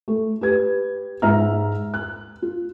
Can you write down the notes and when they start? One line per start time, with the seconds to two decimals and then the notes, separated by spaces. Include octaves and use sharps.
0.08 A3
0.41 G4 B4 G#6
1.22 G#2 E5 A#5 F6
1.94 F#6
2.42 F4